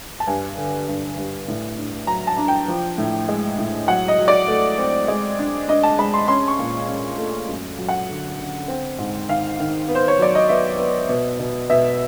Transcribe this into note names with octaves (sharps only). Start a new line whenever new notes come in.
A5
G2 G#5
D3
G2
G2
A2
D4
F#3 A#5
A5
D4
G5
F3
A2
G#3
A2
F#3 F#5
D#5
F#3
D5
A3
C4
G#3
D4
D4 D#5
A5
G#3 B5
C6
C#4 C6
C#6
A#2
C#4
A3
F#2
F#3
F#5
D3
D3
C4
G#2
D#3 F5
D#3
B3
C5
C#5
F#3 D5
D#5
B3 E5
B3
B2
B2
B2 E5